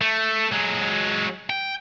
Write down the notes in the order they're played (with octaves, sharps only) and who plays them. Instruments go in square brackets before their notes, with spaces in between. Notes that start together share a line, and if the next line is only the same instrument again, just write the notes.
[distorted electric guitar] A3
F#3 G#3
G5